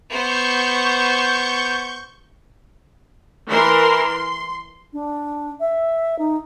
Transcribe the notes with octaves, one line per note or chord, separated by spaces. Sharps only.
B3 C5 C#6 G6
E3 A#4 C6
C6
D4
E5
D#4